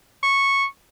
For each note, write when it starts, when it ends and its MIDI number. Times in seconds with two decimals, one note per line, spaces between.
0.23 0.64 85